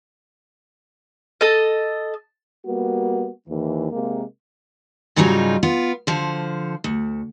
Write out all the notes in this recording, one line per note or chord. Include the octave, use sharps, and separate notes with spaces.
A4 D#5
G3 A#3 B3 F#4
D#2 E3
C3 G#3 A#3
G#2 C#3 F#3 G3 D#4 F4
B3 F4
D3 F3 C5
D2